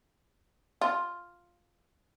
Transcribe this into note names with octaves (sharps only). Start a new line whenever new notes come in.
F4